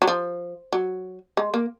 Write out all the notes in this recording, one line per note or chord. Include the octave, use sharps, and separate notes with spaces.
F#3
F3
F#3
G#3
A#3